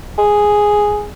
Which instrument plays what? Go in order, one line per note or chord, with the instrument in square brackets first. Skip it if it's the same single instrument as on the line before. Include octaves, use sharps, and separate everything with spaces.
[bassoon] G#4